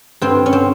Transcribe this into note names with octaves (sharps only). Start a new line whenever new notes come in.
G2 C4
C#4
C4